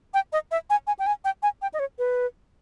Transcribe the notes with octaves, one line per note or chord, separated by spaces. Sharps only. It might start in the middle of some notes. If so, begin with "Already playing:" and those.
G5
D#5
E5
G#5
G#5
G5
G#5
G5
G#5
G5
D#5
C#5
B4